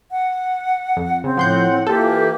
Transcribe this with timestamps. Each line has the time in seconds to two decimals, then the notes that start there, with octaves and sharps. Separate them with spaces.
0.11 F#5
0.97 F2
1.24 C#3 C4
1.37 A2 F3 F#5 C6 G6
1.87 E3 A#3 F4 G4 A4